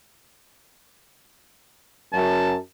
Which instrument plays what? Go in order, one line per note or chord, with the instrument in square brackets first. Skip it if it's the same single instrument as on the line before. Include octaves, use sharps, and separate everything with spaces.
[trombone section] F#2 [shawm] A5